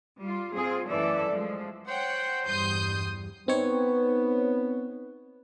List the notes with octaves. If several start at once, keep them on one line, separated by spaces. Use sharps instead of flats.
G3 F4
C4 F4 G#4
F#2 E3 A3 A4 D5 E5
F3 G#3
C5 C#5 F#5 G5
E2 G2 G3 C6 D#6 G6
B3 C4 D#4 C#5